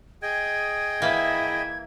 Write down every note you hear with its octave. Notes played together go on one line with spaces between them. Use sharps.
G#4 D#5 G5 G#6
E3 A#3 E4